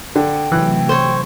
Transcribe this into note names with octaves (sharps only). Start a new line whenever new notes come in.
D3 G5
C3 E3 F#3 A3 F#6
C5 C#5